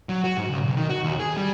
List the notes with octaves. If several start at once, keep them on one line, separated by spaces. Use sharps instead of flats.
F#3
F#4
G#2
C#2
B1
D#3
F#4
D#2
G#4
G3